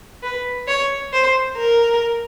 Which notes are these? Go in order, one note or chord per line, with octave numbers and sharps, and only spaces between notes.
B4
C#5
C5
A#4